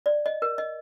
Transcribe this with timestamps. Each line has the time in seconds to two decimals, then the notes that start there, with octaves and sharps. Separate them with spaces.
0.06 D5
0.26 D#5
0.42 A#4
0.58 D#5